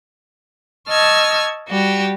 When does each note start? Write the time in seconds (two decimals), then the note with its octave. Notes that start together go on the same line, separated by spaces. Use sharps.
0.88 D#5 A5 C#6 E6 F6 G#6
1.69 G3 F#4 G4